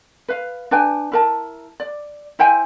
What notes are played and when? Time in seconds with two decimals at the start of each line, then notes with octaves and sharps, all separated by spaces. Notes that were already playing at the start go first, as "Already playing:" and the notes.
0.28 B4 F5
0.71 D4 B4 G5 G#5
1.12 E4 A#4 A5
1.80 D5
2.39 E4 C5 G5 G#5